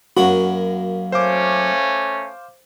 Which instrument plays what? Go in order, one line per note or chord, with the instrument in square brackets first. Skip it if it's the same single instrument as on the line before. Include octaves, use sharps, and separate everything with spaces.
[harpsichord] F#2 A#3 B5 [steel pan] F#4
[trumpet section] A3 C#4 [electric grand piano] C5 F5 D6